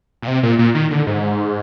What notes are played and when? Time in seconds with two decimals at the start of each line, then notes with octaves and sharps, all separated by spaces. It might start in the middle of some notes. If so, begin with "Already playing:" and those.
0.22 A#2
0.27 C3
0.43 A#2
0.59 A#2
0.75 D#3
0.91 D3
1.07 G#2